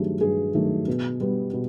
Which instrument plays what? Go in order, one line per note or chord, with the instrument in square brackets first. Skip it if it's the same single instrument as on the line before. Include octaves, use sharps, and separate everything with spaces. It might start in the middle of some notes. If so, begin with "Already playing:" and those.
Already playing: [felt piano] G2 D#3 F#3 A3 G4 G#4
G2 G#4
D#3 F#3 A3
B2
G3 B3
B2